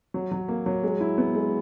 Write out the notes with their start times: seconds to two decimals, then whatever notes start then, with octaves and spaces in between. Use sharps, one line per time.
0.14 F#3
0.31 F#3
0.48 A#3
0.66 F#3
0.84 G#3
1.01 E4
1.18 B3
1.35 G#3